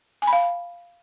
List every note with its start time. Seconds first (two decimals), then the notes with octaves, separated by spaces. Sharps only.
0.22 G#5
0.27 B5
0.33 F5